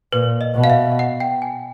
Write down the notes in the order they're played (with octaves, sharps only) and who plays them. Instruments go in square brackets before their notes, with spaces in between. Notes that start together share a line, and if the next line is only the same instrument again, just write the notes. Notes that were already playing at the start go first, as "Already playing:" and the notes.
[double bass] A#2 [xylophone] B4
[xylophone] D#5
[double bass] B2
[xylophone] F5
E5
F#5
G5
G#5